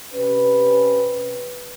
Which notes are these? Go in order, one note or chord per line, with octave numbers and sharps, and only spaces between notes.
C3 C#4 G4 B4